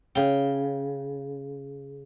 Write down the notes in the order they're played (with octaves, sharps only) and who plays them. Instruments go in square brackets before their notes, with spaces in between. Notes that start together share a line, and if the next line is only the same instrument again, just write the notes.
[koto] C#3 G5